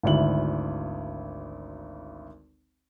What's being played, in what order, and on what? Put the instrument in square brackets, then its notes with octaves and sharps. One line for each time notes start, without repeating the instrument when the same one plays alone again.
[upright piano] G#1 D2 E4 F#7